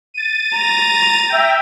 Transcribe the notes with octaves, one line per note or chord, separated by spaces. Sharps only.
A6 D#7
A#5
E5 G5